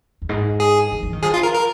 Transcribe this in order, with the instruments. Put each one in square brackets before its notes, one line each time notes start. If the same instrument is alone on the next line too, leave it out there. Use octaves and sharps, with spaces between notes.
[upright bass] F2
G#2
[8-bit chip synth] G#4
[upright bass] F3
F3
D#3
[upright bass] F3 [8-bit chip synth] G#4
[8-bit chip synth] F4
A#4
A#4